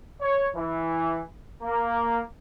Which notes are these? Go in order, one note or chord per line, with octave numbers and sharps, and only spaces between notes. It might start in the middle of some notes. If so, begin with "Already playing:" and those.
C#5
E3
A#3